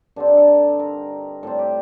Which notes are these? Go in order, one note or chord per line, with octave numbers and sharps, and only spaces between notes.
G2 D3 G3 C4 D4
D#4
A4
A4
A#4
A2 G3 C4 A4
G4